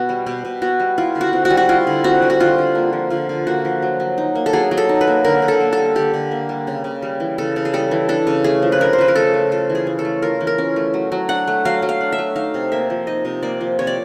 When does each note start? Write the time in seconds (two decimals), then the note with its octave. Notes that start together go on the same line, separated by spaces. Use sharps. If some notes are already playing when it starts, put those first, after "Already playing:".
Already playing: B2 B3 F#4
0.09 G3
0.26 B2 G4
0.45 B2
0.62 B3 F#4
0.80 G3
0.98 E4 F4
1.15 D3
1.21 F#4
1.33 C4
1.45 F#4
1.50 G3
1.57 F#4
1.69 E4 F4
1.87 D3
2.04 C4 F#4
2.22 G3
2.30 F#4
2.40 D3 F4
2.58 D3
2.75 A#3
2.93 F3
3.10 D3 F4
3.29 D3
3.47 A#3 F#4
3.65 F3
3.82 F#3
4.00 F#3
4.18 D#4
4.35 A#3
4.46 A4
4.53 F#3 G#4
4.71 F#3
4.78 A4
4.89 D#4
5.01 B4
5.07 A#3
5.25 D3 A#4
5.42 D3
5.48 A4
5.60 A#3
5.73 G3 A4
5.95 D3 G4
6.14 D3
6.31 A#3
6.49 G3
6.67 C#3
6.84 C#3
7.02 G3
7.20 E3
7.38 C#3 A4
7.56 C#3
7.65 G#4
7.74 G3 A4
7.91 E3
8.09 D4 A4
8.27 C#3
8.44 A3 G#4
8.62 F3
8.72 B4
8.80 D4 A#4
8.93 C5
8.99 C#3 B4
9.08 A#4
9.16 A3 A4
9.34 F3
9.51 F4 A4
9.70 E3
9.75 G#4
9.87 C#4
9.99 A4
10.05 A3
10.22 F4 A#4
10.41 E3
10.47 A#4
10.58 C#4
10.76 A3
10.94 F#3
11.12 F#3
11.29 D4 F#5
11.47 A3
11.65 F#3 F5
11.82 F#3
11.89 F5
12.01 D4
12.12 E5
12.18 A3
12.36 D#4 F5
12.54 C3
12.72 A#3 E5
12.90 F3
13.07 D#4 D#5
13.25 C3
13.43 A#3 D5
13.61 F3
13.79 C3 C#5
13.87 D5